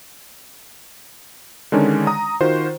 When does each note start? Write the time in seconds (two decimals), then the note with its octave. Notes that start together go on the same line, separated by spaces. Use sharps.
1.72 D3 D#3 G#3 C#4 D4
2.07 A#5 D#6
2.41 D#3 F4 F#4 C5